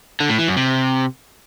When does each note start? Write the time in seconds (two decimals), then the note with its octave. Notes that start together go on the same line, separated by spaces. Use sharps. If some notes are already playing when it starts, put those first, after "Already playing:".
0.20 D3
0.29 A2
0.38 E3
0.47 F#2
0.56 C3